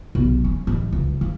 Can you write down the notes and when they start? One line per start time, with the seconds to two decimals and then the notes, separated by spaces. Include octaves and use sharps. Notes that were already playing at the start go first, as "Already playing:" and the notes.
0.15 B1
0.44 C#4
0.67 A1
0.92 C#2
1.21 F3